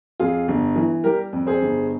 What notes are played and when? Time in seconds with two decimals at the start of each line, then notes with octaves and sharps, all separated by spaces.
0.20 F2 F4 G#4
0.48 G1
0.76 E3
1.04 G3 G4 A#4
1.33 F2
1.47 G#4 C5
1.61 G1